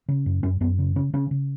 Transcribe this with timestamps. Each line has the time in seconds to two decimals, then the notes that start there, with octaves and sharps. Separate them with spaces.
0.08 C#3
0.26 F#2
0.43 F#2 C#4
0.60 F#2 B3
0.79 C#3
0.96 C#3 C#4
1.13 C#3 C#4
1.31 C#3